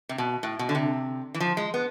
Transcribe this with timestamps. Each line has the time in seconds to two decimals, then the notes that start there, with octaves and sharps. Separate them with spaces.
0.09 C3
0.18 B2
0.43 A2
0.59 B2
0.69 D3
0.75 C3
1.34 E3
1.40 F3
1.57 G#3
1.74 B3